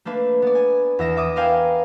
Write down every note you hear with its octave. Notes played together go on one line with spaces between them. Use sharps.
A3 A#3 D4 B4
B3 D5
G#5
E2 E5 A#6 E7
E5 D6 D#6
A#4 B4 D5 F5 G5 G#5